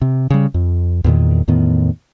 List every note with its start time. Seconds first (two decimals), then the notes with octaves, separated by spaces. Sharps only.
0.02 C3
0.30 C#3 G3
0.54 F2
1.04 E2 A#2 D#3
1.48 E2 A2 D#3 B3